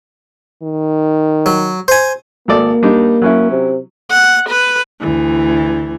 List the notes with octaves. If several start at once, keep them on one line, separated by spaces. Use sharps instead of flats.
D#3
F#3
C5 G#5
G#1 A#3 A4 D5
G3 D4 D#4
F#3 C#4 E4
C3
F#5
B4
D2 E3